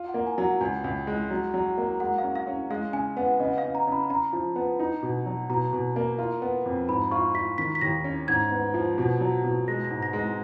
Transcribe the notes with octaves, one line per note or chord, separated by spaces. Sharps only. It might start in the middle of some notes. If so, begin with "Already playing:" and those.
Already playing: F4
F#5
A#3
G#5
F#3
F#5
C#2 G#5
C#2
G#3
F#3
F#3
A#3
G#3 F#5
F5
C#4
F5
C#4
G#3 F5
C#3 G#5
B3 F#5
C#3 D#5
F5
C#3
A#5
C#3
B5
B5
C#3 A#5
F3
B3
D#4
B2
F#3
B2 A#5
B2
A#3
F4
B3
F2
G#2 B5
F4 C#6
F4 B6
D#3 B6
B6
D#2 A#6
C#4
G#2 G#6
B3
F3
B2
F#3
B2
G#3 A#6
A#6
G#2
A#6
G#3
A#6